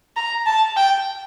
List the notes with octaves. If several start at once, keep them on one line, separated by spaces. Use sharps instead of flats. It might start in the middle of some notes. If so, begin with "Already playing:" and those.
A#5
A5
G5